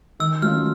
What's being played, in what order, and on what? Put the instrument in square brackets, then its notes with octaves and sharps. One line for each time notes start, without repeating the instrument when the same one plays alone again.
[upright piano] D#3 [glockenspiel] E6
[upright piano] F#3 A3 C#4 F4 [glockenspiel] F6